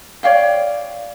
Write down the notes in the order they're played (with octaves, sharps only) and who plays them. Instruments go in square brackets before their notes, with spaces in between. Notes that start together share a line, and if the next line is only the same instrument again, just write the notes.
[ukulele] C#5 D5 F5 G5